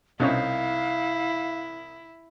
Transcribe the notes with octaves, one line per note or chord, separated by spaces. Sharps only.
C2 B2 C4 C#4 D#4 E4 C#5 F5